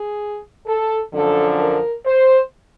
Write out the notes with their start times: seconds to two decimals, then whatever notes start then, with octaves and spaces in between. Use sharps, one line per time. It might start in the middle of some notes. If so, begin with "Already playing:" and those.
Already playing: G#4
0.67 A4
1.13 F#2 D3 F3 A4
1.59 A#4
2.05 C5